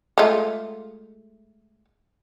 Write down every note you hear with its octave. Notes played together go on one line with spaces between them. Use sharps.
G#3 A3 F4